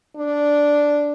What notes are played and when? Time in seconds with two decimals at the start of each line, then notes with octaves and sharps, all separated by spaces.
0.17 D4